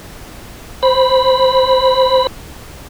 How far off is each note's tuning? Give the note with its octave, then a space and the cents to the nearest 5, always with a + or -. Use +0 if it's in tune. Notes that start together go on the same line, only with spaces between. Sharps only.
C5 +0 B5 +0